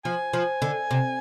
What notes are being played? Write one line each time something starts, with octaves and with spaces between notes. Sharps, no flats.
F3 G#5
F3
D3
C3